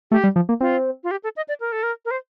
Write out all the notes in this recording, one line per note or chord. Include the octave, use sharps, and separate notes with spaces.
A3 G4
G3
F3
A#3
C4 F4
F4
G4
A4
D#5
D5
A#4
A4
A#4
A#4
C5